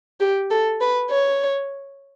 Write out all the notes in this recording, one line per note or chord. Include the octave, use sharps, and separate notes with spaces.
G4
A4
B4
C#5